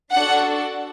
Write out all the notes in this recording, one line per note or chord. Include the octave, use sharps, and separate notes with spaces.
D4 F#4 A4 F#5